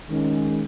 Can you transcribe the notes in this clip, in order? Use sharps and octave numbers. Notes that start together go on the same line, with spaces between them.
D#3 G#3 C#4